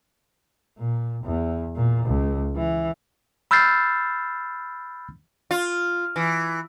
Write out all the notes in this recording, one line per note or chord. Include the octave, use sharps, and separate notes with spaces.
A#2
E2
A#2
C#2
E3
B5 E6 F6 G6 A6 C7
F4
E3